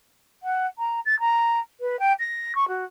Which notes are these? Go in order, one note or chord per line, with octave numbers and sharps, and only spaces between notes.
F#5
A#5
A6
A#5
B4
G5
A#6
C#6
F#4